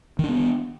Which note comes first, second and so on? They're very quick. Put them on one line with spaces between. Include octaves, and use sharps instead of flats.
D#3 D4 B3